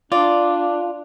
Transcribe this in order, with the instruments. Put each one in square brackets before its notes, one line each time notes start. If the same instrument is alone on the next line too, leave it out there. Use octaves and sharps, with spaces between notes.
[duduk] D4 [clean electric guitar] F4 [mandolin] D5